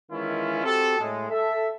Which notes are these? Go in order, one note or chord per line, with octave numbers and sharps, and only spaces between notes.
D#3 E3 G#3 C#4 E4 F4
C4 F#4 G4 A4
A2 G#3
A4 E5